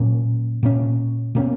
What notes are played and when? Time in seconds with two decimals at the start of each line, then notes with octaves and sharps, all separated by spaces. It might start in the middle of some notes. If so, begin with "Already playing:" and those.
Already playing: A#2 F#3 A#3 C#4
0.63 A#2 A#3 C#4
1.35 B2 A#3 C#4